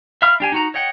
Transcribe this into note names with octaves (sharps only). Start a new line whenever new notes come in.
E5 F5 B5 F6
D4 G4 G#5
D#4 F#4 A#5
C#5 D#5 F#5 G5